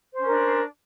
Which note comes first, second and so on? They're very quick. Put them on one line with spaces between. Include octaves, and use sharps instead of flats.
C5 C#4 A#4 D4